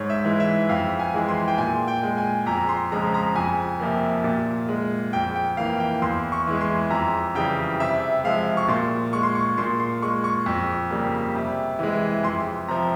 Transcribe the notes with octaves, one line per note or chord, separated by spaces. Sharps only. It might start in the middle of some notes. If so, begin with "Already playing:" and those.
Already playing: G#2 C#5
E5
E3 G#3
E5
F2 F5
G#5
E3 G#3
C6
G5
A#2 G#5
G5
G#3
G#5
F2 A#5
C6
C#3 F3 G#3 A#5
A#5
F2 G#5
C3 F3 A#3
A#2
G#3
F2 G5
G5
E3 A#3 F5
G5
E2 C6
C#6
E3 G#3
C6
F2 A#5
C#3 E3 G3 G5
C3 E5
F3 G#3 F5
C#6
A#2 C6
G#3 C#6
C6
C#6
A#2 C6
C6
G#3 C#6
C#6
F2
C#3 G3 A#3
C3
E3 G#3
F2 C6
C3 F3 A#5